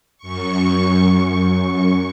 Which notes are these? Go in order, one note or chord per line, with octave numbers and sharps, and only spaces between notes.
F#2 C#6